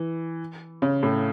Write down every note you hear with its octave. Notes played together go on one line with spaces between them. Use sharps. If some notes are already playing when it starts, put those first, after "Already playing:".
Already playing: E3
C#3
A2